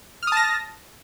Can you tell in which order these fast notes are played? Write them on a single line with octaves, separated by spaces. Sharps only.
F6 D#6 A5 A#6